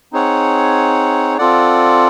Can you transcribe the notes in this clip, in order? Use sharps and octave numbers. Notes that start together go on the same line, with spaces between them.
C4 D#4 G#4 C#5 F#5
C4 F4 A4 D5 F#5